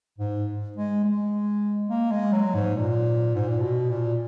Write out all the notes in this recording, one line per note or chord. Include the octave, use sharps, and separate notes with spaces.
G#2
G#3
G#3
A#3
G#3
F#3
G#2
A#2
G#2
A#2
B2
A#2